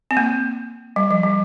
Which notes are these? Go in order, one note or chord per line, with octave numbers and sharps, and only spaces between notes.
C4
A#3
G3
F3
G3